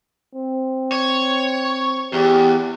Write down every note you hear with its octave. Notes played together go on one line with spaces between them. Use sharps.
C4
C#5
E2 G4